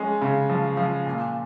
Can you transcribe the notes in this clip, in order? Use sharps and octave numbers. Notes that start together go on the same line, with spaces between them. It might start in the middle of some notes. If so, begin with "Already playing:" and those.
Already playing: F3 G#3 C#4
C#3
F3
F3
A#2